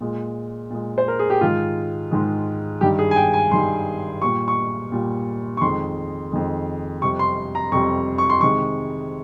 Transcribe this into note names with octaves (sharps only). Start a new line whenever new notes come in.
A#2 G#3
A#2 G#3
C5
A#4
G#4
G4
G#2 D#3 G#3 F4
G#2 D#3 G#3
G2 D#3 G3 G4
G#4
G#5
G5
G#5
G2 D#3 G3 C6
A#2 G3 C#6
C#6
A#2 G3
C#6
F2 D#3 G#3 C6
F2 D#3 G#3
F2 C3 G3 C#6
C6
A#5
F2 C3 G3 C#6
C#6
C6
C3 D#3 G#3 C#6